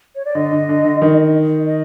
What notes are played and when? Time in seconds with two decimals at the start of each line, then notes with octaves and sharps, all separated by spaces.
0.16 C#5
0.25 D5
0.35 D3 D#5
0.53 D3
0.69 D3
0.85 D3
1.02 D#3
1.66 D#5